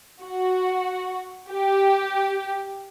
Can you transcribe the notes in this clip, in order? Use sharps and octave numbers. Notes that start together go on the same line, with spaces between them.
F#4
G4